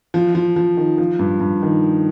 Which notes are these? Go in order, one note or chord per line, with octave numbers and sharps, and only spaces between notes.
F3
F3
F3
D#3
F3
G2
G2
D#3